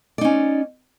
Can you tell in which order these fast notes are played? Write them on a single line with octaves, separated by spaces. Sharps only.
D5 D#4 C#4